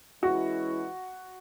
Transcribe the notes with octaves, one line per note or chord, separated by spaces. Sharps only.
E3 G#3 C#4 E4 F#4